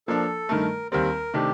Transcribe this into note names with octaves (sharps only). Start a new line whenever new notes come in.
F3 A#3 D4 A4
G2 D#3 A3 A#4
D#2 D#3 G3 C4 A#4
C3 D#3 A3 D4 G4